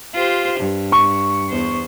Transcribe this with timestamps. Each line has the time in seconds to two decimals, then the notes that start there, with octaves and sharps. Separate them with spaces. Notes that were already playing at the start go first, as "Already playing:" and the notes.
0.14 F4 G4 C5
0.60 G2
0.92 C#6
1.49 E2 B3 C5